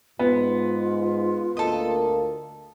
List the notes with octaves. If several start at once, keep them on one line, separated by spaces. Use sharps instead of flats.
G#2 B3 F4
D2 A#3 A4 D#5